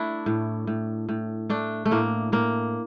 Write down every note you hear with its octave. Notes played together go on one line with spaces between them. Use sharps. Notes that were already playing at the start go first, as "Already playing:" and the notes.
Already playing: A3 D4 E4
A2
A2
A2
A3 D4
A3
A2 A#3
A2 A#3